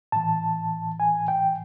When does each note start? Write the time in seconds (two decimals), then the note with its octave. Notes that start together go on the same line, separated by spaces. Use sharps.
0.12 A2 E3 A5
1.00 G#5
1.28 G5